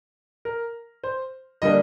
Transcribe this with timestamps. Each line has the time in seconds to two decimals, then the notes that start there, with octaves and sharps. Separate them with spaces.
0.45 A#4
1.04 C5
1.62 D3 G3 A#3 D4 D#5